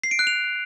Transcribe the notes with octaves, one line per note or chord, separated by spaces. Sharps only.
C7
D7
F#6
F7